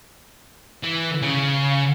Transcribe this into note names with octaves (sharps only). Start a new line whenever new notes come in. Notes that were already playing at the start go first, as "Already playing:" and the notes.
E3
C#3